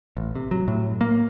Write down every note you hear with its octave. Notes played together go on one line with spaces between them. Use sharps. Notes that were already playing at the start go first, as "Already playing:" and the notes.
A1
C3
F#3
A2
A#3